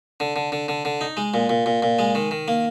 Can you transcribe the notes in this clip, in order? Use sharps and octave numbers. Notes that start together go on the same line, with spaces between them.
D3
D3
D3
D3
D3
D#4
G#3
A#2
A#2
A#2
A#2
G#3
D#3
D#3
A#3